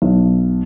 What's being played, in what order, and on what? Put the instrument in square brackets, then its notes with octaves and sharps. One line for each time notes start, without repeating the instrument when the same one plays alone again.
[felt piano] B1